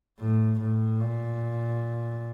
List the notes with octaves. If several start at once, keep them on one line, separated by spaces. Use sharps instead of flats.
A2
A2
A#2